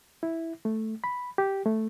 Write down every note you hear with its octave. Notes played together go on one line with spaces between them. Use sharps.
E4
A3
B5
G4
A3